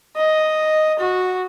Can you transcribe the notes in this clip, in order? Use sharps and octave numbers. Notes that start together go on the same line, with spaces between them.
D#5
F#4